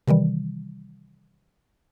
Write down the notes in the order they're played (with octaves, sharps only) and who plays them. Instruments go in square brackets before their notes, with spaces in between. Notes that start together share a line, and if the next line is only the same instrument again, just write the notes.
[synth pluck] C3 D#3 E3 G3